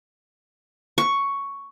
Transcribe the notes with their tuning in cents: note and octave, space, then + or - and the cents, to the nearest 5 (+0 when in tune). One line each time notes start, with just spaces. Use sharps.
C#6 +5